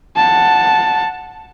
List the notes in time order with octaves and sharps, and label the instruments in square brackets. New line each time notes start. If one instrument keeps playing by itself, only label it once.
[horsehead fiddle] F#5 A5